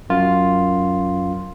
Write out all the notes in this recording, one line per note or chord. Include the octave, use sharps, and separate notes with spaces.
F#2 F4